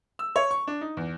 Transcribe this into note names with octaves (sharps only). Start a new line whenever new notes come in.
E6
C#5
C#6
D4
D#4
E2